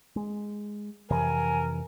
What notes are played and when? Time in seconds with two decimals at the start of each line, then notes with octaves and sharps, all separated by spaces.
0.16 G#3
1.11 F2 C3 E3 A#4 G#5